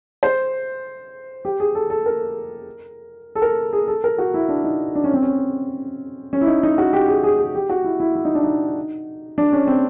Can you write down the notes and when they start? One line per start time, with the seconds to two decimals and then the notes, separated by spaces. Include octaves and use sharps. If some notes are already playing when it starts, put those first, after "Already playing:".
0.23 C5
1.45 G4
1.60 G#4
1.75 A4
1.90 A4
2.06 A#4
3.35 A4
3.42 A#4
3.73 G#4
3.88 A4
4.04 A#4
4.18 F#4
4.34 E4
4.49 D4
4.64 D#4
4.95 D4
5.04 C#4
5.14 C4
5.22 C#4
6.33 C#4
6.41 E4
6.47 D#4
6.63 D#4
6.78 F#4
6.93 G4
7.08 G#4
7.24 G#4
7.39 G#4
7.55 G4
7.69 F#4
7.84 E4
8.00 E4
8.15 E4
8.25 D#4
8.35 D4
8.44 D#4
9.38 D4
9.53 C#4
9.67 C4